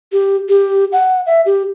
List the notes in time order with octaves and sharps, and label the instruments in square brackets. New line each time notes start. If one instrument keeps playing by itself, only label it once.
[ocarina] G4
G4
F#5
E5
G4